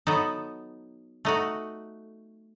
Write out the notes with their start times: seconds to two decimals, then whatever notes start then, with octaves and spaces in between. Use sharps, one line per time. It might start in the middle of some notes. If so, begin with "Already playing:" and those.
0.07 F#3 B3 D#4 A4
1.25 A3 D#4 F#4